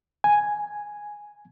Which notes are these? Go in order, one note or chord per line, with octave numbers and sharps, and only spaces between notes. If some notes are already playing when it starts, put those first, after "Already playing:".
G#5